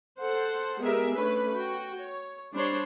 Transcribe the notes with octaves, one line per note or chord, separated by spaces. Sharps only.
A4 C5 F#5
G#3 B3 G4 G#4 A#4 E5
A3 C#4 D4 B4
F#4 G5
C#5
G3 D4 C5 C#5 C6